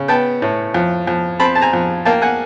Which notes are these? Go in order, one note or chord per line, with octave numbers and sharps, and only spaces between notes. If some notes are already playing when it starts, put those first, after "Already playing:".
Already playing: C#3
B3 G5 A5
A2
F2
F2
C4 A5 B5
A5
G#5 A#5
F2
A#3 G5 A5
F#5 G#5